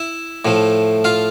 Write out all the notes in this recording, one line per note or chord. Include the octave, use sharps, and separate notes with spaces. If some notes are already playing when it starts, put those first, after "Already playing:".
Already playing: E4 E5
A2 F3 A3
F4 F5